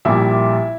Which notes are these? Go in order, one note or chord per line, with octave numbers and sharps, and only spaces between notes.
A#1 A#2 G3 E4 E5